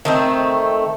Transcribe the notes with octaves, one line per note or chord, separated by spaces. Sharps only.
D#3 A3 C4